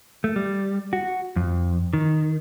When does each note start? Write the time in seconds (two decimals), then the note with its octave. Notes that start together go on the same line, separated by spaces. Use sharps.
0.24 A3
0.36 G3
0.93 F#4
1.36 F2
1.93 D#3